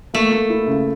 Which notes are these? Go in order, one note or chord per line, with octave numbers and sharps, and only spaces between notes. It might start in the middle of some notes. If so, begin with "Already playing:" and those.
A3 A#3
A#3
E4
C#3